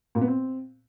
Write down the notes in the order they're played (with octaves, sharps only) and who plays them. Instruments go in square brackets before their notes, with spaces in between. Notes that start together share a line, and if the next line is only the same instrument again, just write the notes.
[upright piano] A#2
B3
C4